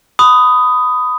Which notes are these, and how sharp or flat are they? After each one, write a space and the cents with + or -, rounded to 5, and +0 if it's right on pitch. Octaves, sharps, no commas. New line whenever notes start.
B5 +20 D#6 +0